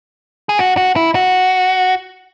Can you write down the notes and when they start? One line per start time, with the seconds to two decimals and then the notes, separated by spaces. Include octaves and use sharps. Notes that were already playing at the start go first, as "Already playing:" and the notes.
0.49 G#4
0.58 F#4
0.77 F#4
0.96 E4
1.15 F#4